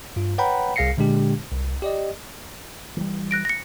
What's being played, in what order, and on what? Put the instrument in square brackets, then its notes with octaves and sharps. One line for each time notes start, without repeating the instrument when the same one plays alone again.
[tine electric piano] G2 F4
B4 C#5 F#5 G5 A#5 B5
C2 G#4 F5 A#6 C7 C#7
A#2 D3 G#3 D4 G4
C2
G4 D5 D#5
[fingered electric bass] E3 F#3 G3
[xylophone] F#6 A#6 D7
A#6 C#7